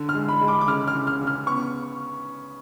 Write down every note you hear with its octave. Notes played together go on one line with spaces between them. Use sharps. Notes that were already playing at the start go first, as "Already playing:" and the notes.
Already playing: D3
F6
G#3
B5
G#3
D6
D6
C#3 F6
F6
C#3
F6
C#3
F6
B3 C#6